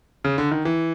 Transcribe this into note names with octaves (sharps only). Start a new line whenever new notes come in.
C#3
D3
D#3
E3